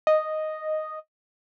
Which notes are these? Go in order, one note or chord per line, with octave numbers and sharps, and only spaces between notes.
D#5